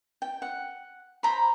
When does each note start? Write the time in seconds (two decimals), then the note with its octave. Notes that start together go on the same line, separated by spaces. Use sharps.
0.22 G5
0.42 F#5
1.23 C5 A#5 B5